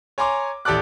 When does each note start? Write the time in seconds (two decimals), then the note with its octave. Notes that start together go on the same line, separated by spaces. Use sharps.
0.18 C#5 G#5 A#5 C6 D6
0.65 A1 G4 A4 D5 D6 F#6